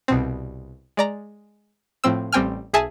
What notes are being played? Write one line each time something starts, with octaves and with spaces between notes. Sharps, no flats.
C2 B2 C4
G#3 D5 A#5
A2 F3 C4 E6
A1 G3 C4 G5 G#5 F6
B1 G#4 E5 G#5 A5